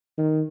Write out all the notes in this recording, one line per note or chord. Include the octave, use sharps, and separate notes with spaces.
D#3